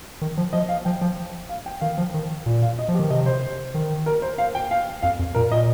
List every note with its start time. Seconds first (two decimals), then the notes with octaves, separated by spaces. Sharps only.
0.21 D#3
0.37 F3
0.53 F3 D#5
0.69 F5
0.85 F3 G5
1.01 F3
1.49 F5
1.66 G5
1.81 D#3 F5
1.98 F3
2.14 D#3
2.46 A#2
2.62 F5
2.79 D#5
2.88 F3
2.94 G4
2.99 D#3
3.10 C3 D#5
3.26 C5
3.74 D#3
4.06 A#4
4.22 C5
4.38 F5
4.55 G5
4.71 F5
5.03 F2 F5
5.19 F2
5.35 A#2 A#4
5.51 A#2 D#5